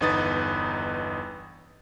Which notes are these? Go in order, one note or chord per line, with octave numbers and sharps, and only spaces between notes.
G1 E2 D#4 B4 D#6 A6